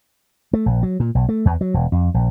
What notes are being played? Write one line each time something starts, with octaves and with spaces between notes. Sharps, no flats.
A3
A#1
F#3
A#2
B1
A3
E2
F#3
E1
F2
A#1